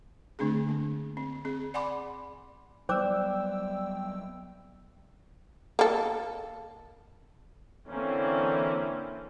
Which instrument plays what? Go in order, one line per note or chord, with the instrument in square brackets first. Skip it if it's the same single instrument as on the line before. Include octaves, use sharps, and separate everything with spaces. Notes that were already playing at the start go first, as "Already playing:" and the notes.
[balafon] D3 A3 C4 D4 G#4
A#3
C4
C4 G#4
D5 F#5 G#5 B5 C6 D6
[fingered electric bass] F#3 G3 B3 [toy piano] C5 D6 [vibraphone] D5 [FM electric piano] G5 E6
[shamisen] A#3 A4
[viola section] D3 E3 A#3 C4 C#4